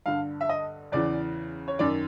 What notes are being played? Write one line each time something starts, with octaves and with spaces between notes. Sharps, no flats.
G2 D3 F5
E5
D#5
E2 C#3 E3 D5
C#5
F#2 D#3 D5